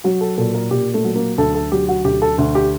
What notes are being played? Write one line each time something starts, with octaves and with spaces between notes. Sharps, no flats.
F#3 F#4
A4
A#2 A4
A#4
A#2 G4
A3
F#3
A#3
D2 A4
A4
F#3 G4
F#4
D2 G4
A4
D2
G4